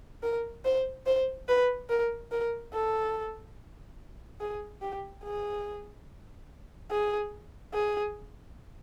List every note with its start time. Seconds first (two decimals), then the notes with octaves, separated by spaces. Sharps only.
0.23 A#4
0.65 C5
1.06 C5
1.48 B4
1.89 A#4
2.31 A#4
2.73 A4
4.41 G#4
4.82 G4
5.24 G#4
6.91 G#4
7.74 G#4